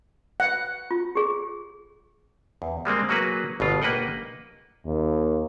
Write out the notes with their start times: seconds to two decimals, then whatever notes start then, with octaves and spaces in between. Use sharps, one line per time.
0.40 F#5
0.91 F4
1.15 G4 G#4
2.62 E2
2.85 G3 G#3 A#3 C4
3.09 F#3 A#3 F#4 G#4 B4
3.60 G1 B2 F4
3.82 A#3 B4 D#5 F#5 G5
4.86 D#2